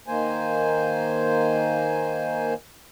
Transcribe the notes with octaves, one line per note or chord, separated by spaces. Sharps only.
D#3 A#3 C5 G#5